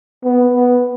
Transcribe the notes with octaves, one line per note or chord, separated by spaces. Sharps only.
B3
B3